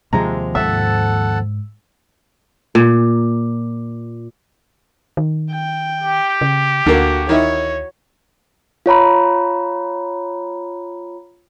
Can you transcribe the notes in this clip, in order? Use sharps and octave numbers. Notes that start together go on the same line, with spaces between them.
D#2 C3 F3 G#3 A#5
G#2 A4 E5 F#5 A5
A#2
D#3
G5
G4
C#3
D2 D3 A#3 F#4
D#3 E4 C#5
F4 C#5 A#5 B5